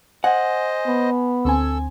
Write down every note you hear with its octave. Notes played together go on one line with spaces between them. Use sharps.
C5 D#5 F#5 G#5
B3
D2 C4 A4 G#5 E6